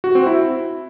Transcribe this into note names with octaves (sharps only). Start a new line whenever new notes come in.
F#4
C4
E4